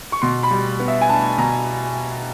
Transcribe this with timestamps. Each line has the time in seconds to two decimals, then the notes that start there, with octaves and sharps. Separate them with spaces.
0.12 C#6
0.22 B2 C6
0.43 B5
0.51 G3
0.79 B3
0.88 E5
1.01 G#5
1.09 D4 A5
1.38 B2 A#5